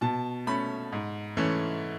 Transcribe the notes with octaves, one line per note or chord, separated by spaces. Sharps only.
B2 A5
A3 C#4 B5
G#2
E3 A3 C#4